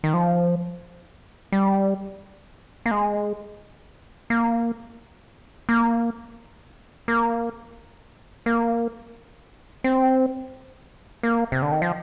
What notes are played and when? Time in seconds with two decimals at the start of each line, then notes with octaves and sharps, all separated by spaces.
0.04 D#3
0.14 F3
1.52 G3
2.86 A#3
2.91 G#3
4.30 A#3
5.69 A#3
7.08 A#3
8.46 A#3
9.84 C4
11.23 A#3
11.52 C3
11.62 D3
11.72 D#3
11.82 F3